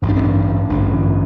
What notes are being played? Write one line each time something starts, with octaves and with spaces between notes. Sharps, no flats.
A1 G2 D3
D4
C4
D4
A1 G2 D3